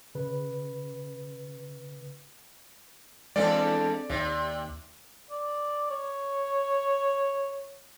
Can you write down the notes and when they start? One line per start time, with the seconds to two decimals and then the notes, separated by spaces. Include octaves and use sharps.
0.15 C#3 B4
3.36 E2 G#3 C4 D4 A4 D5
4.10 D#2 C3
5.31 D5
5.90 C#5